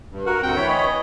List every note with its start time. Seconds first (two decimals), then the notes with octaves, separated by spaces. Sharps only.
0.11 G2
0.26 F#4 A#4
0.43 D2 C4 F#5 G5
0.56 E3 C#5 B5
0.69 D#5